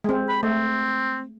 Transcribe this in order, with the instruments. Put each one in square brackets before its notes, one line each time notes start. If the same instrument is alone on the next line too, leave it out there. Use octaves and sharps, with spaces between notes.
[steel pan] G#3 C4
[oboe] B5
[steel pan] A3 [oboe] C4